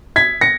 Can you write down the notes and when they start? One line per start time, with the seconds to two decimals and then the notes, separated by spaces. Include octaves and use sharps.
0.16 G#6 B6
0.41 A#6 C#7